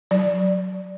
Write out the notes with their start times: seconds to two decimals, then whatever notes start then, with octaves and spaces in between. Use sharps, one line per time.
0.11 F#3 D5